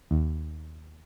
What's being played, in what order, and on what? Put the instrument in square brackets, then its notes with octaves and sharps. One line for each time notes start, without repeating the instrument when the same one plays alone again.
[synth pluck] D#2